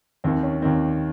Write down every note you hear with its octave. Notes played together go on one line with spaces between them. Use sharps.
D#2 D#3 C4
C#4
D#2 D#3 C4